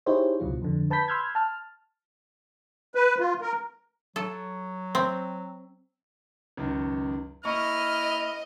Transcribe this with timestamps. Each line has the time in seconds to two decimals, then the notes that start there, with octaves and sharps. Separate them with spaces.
0.06 D#4 E4 G4 G#4 C5 C#5
0.40 C#2 G2 B2 F#3 F4
0.62 F2 D3
0.90 B4 A5 B5 G6 B6
1.08 B5 C6 E6 F6 G6 G#6
1.35 A5 F6
2.95 B4
3.19 F4
3.42 A#4
4.16 F#3 A4
4.95 C4
6.57 C#2 F#2 D#3
7.45 A#3 E4 D#5 C#6 F6